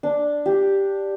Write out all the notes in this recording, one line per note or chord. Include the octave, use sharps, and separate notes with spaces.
D4
G4